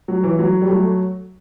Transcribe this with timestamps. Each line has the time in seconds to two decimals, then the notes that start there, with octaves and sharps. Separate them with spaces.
0.08 F#3
0.24 E3
0.39 F#3
0.61 G3
0.69 F#3 A3